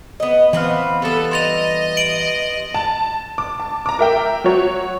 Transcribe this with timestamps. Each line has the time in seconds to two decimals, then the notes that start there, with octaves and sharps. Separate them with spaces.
0.20 B3 D#5
0.53 E3 B3 C4 B4 F5
1.02 G3 B3 A4
1.31 D#5 C6 A6 F7
1.97 D7 F#7
2.74 A5
3.38 D6
3.60 A5
3.86 A#5 D6
3.99 A#4 E5 G5
4.44 F#3 F#4 C#5